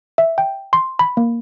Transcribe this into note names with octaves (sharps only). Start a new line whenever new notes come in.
E5
G5
C6
B5
A#3